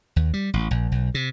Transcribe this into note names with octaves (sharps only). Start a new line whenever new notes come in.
D#2
G3
A1
A#1
B1
C3